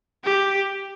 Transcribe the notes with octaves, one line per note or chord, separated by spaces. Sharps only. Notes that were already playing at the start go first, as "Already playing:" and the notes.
G4